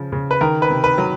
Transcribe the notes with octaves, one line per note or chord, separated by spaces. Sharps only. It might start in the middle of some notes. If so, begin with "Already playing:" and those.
Already playing: C#3 F3
C#3
B4
D#3 A#4
B4
C3
B4
F#3